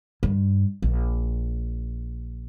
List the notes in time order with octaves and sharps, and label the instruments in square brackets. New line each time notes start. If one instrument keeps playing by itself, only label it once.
[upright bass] G2
A#1